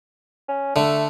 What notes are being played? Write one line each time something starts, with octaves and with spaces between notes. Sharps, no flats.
C#4
D3 A3